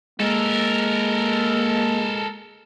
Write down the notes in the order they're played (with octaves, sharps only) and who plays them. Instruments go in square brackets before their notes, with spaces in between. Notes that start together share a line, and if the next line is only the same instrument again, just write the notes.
[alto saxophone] G#3 [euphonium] A#3 [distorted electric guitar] A4 A#4